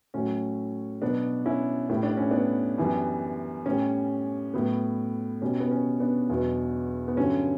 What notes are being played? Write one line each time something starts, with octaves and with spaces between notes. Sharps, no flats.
A2 F#3 C#4
B2 F#3 B3 D4
C#4 E4
A2 G3 E4
D4
C#4
B3 D4
F#2 E3 G3
A2 G3 C#4
A2 F#3 B3
B2 G3 C#4
B3
C#4
B3 D4
E2 B2 F#3
B3
G2 D3 F#3 C#4